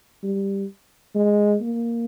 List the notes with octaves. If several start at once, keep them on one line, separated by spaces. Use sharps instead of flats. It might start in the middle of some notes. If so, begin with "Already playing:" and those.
G3
G#3
A#3